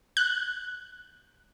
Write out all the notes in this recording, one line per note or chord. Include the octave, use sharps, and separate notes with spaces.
F#6